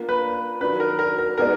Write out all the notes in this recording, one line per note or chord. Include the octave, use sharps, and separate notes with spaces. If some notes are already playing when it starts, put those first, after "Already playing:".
Already playing: A#3 D4 F4
B4
D#3 F#3 D4 B4
A#4
A#4
A#4
G#3 B3 D#4 G#4 A#4 D5